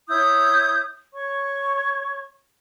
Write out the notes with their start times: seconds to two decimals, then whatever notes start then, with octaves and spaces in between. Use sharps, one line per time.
0.09 E4 C#5 D#6 G6
1.14 C#5 C#6